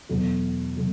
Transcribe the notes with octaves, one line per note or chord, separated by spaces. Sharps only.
E2 B2 F#3 A3
B2 F#3 A3